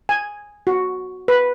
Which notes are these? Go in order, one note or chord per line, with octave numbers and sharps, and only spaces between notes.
G#5
F#4
B4